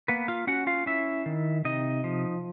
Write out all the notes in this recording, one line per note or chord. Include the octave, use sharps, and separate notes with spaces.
A#3 B3 B4
F4 F5
C#4 F#4 F#5
F4 F5
C#4 E4 E5
D#3
C3 D#4 D#5
F3